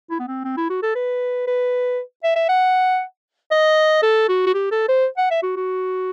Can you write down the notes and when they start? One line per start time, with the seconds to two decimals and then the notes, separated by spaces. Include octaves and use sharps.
0.10 E4
0.19 B3
0.28 C4
0.45 C4
0.57 E4
0.70 F#4
0.83 A4
0.95 B4
1.47 B4
2.24 E5
2.36 E5
2.49 F#5
3.51 D#5
4.03 A4
4.29 F#4
4.47 F#4
4.54 G4
4.71 A4
4.89 C5
5.18 F#5
5.31 E5
5.43 F#4
5.57 F#4